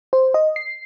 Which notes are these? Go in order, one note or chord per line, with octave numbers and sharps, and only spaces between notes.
C5
D#5
C7